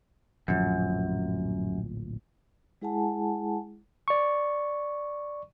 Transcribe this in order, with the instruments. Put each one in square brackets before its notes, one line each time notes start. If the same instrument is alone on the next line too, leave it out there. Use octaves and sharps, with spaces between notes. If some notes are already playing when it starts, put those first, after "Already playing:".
[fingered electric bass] D1 A#1 F3 [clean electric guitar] F#2
[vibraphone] G#3 E4 G#4 F#5 G#5 A5
[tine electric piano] D5 C#6